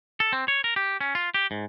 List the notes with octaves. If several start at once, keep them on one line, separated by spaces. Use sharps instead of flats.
A4
C4
C#5
A#4
G4
C#4
F4
G4
G#2